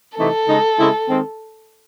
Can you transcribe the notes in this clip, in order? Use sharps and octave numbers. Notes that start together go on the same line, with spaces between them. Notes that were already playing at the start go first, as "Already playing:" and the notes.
C3 E3 A3 C4 D#4 A4
C#3 G#3 D#4
C#3 G#3 C4 E4
D#3 G#3 C4